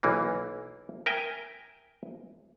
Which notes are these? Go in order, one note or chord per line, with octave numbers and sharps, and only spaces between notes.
B1 E3 A#3
A#4 E5 G5 G#5